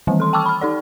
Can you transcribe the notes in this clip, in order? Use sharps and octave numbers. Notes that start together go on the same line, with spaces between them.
D#3 E3 G3 A3 C4
A4 C6
G5 A5 C#6 D6 E6 F6
B5 F6
D#4 A4 D5